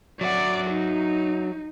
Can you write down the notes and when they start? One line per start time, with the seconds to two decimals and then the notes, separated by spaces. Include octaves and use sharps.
0.21 F#3 D5 E5 F#5
0.70 D#4